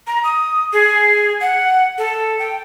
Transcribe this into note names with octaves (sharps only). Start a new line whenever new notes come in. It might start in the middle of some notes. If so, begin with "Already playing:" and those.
A#5
D#6
G#4
F#5
A4
G5